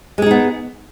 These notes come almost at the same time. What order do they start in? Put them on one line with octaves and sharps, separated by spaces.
G#3 G#4 D#4 B3